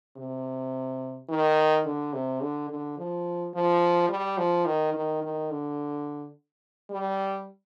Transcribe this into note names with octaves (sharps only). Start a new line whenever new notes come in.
C3
D#3
D3
C3
D3
D3
F3
F3
G3
F3
D#3
D#3
D#3
D3
G3